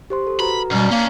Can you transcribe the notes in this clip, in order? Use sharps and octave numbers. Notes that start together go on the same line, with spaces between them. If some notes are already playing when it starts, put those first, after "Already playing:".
G4 C5 C6
A4
F#4 B4 A#5 B5
F#2 B2 G3 D5 A#5 F6
A#3 C#4 D4